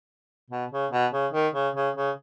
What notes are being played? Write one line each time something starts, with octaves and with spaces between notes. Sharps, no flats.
B2
C#3
B2
C#3
D#3
C#3
C#3
C#3